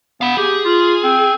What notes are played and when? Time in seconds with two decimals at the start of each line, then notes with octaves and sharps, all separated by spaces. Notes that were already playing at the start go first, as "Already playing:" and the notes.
0.21 B3 F5 B5
0.37 G4 G#4
0.65 F4
1.04 C4